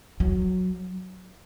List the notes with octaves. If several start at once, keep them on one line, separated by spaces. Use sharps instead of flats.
F#3